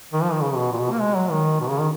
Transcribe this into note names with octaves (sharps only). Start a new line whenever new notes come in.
D#3
F3
D#3
C#3
B2
A#2
B2
A#3
G#3
F#3
D#3
B2
C#3
D#3